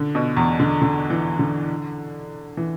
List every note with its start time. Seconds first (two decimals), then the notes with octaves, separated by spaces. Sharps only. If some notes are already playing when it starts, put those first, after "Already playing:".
Already playing: D3
0.15 B2
0.37 E2
0.60 D3
0.82 D3
1.10 E3
1.39 D3
2.57 E3